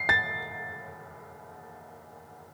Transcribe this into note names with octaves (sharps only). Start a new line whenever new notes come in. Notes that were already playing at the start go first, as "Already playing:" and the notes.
Already playing: C7
A6